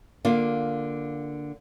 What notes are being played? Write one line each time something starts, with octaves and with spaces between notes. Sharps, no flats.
D3 A#3 F4